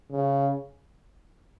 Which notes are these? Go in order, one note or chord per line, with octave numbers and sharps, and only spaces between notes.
C#3